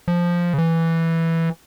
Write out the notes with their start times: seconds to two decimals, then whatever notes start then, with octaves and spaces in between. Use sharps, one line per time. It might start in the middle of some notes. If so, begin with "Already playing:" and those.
0.08 F3
0.53 C#3
0.58 E3